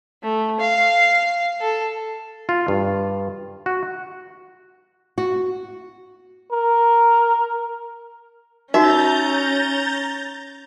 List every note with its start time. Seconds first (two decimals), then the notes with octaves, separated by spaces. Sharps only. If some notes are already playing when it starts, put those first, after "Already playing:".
0.23 A3
0.60 F5
1.61 A4
2.49 F4
2.68 G2
3.66 F#4
5.18 F#4
6.52 A#4
8.74 C#4 D#4 F#4 E5 A#5 G6 A6